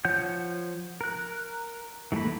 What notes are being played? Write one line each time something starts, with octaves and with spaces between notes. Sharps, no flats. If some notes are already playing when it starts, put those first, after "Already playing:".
F3 C#5 F#5 G6
A#4 F#6
E3 G3 A3 A#3 B5